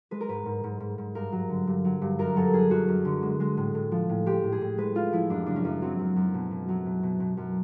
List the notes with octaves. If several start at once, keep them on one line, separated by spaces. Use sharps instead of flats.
G#3 B4
A#4
G#2 B4
G#2
G#2
G#2
G#2
G2 A#4
F#3
D3
G2
F#3
G2
F#2 A#4
F#3 A4
F#2 G#4
F#2 F#4
F#2
D3
G#3
G#3
A2
A2
F3
A2
G#3 G4
A2
G#4
A2
G#3 B4
G#3 F4
F3 E4
F#2 D4
C#3 D4
C#4
F#2
F#3 C4
F#2
F#2
B2
B2
F#3
B2
B2
B2
F#2